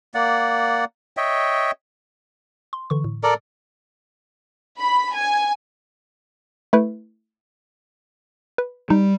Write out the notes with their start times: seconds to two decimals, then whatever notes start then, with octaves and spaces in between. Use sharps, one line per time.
0.14 A#3 D5 F#5
1.17 C#5 D#5 E5 G5
2.73 C6
2.90 D3 E3 C#6
3.04 A2
3.23 A4 A#4 D5
4.79 B5
5.15 G#5
6.73 A3 E4 B4
8.58 B4
8.90 G3 D#4